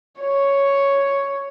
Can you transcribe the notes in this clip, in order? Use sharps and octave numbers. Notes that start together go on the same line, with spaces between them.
C#5